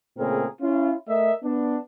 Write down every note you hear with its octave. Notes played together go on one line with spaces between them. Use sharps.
A#2 C#3 A3 C4 G#4 A#4
C#4 E4 F4
A3 A#4 D#5 E5
B3 D4